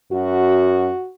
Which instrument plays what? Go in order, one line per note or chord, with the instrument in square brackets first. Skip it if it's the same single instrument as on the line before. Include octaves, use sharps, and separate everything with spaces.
[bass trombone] F#2 [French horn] F#4